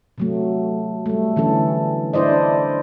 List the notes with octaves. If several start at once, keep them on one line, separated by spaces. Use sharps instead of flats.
C3 F#3 A3
G3 A3
D3 E3 C#4 A4
D4 E4 C5 D5 D#5